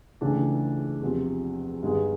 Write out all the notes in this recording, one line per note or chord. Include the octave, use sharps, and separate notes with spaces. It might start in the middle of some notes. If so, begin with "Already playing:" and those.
C#2 C#3 E3 A3 D4
E2 C3 F3
G2 D#3 G#3 B3